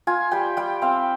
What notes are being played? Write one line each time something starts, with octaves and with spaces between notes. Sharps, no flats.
F4 G#5
G3 G5
G3 G5
C4 F5